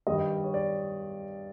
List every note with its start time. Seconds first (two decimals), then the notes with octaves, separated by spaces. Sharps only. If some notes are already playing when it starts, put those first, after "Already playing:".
0.07 G2 D#3 G3 D#5
0.44 C#5
0.54 D5